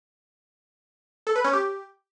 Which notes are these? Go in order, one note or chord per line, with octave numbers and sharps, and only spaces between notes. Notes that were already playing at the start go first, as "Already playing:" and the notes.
A4
B4
C#4
G4